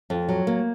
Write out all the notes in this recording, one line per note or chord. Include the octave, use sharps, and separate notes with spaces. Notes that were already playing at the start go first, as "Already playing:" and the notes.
F2
F#3
A#3